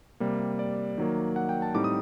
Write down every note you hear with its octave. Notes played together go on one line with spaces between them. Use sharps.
C3 G3 A#3
D5
D#3 F#3 A#3
F#5
G5
A5
A2 G3 C4 D#4 D6
D#6